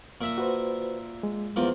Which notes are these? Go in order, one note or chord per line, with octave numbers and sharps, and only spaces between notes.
A#2 E5 A#5
F#4 B4 C5
G#3
E2 F3 A#3